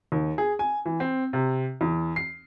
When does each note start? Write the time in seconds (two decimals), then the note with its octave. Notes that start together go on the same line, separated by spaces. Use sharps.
0.12 D#2
0.38 G#4
0.59 G#5
0.86 E3
1.00 C4
1.33 C3
1.81 E2
2.16 C7